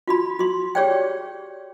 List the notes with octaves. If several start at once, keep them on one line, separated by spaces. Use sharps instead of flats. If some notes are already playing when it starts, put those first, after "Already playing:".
F4 F#4 B5
F#4 C6
G4 G#4 C#5 D5 G5